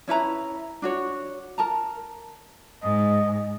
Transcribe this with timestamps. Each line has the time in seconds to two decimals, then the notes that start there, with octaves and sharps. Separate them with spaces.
0.08 C#4 E4 B4 A#5
0.82 D4 F#4 C#5
1.58 A#4 A5 A#5
2.83 G#2 D#5